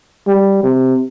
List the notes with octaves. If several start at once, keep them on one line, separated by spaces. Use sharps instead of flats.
G3
C3